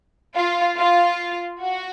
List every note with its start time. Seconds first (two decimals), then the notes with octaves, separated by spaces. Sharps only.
0.35 F4
0.77 F4
1.60 F#4